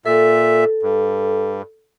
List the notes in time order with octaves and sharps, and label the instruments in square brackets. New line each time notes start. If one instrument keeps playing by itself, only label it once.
[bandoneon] A#2 E5 [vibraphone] A4
[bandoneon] G2